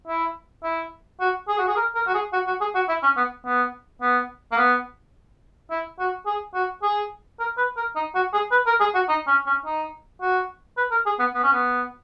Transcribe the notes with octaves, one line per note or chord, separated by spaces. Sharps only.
E4
E4
F#4
G#4
F#4
G#4
A#4
A#4
F#4
G#4
F#4
F#4
G#4
F#4
E4
C#4
B3
B3
B3
A#3
B3
E4
F#4
G#4
F#4
G#4
A#4
B4
A#4
D#4
F#4
G#4
B4
A#4
G#4
F#4
D#4
C#4
C#4
D#4
F#4
B4
A#4
G#4
B3
B3
C#4
B3